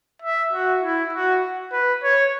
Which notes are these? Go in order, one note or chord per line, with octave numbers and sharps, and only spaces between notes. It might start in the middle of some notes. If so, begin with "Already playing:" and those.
E5
F#4
E4
F#4
B4
C#5